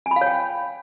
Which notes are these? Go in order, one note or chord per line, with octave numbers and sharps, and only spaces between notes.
G#5
B5
F5
C#5
G5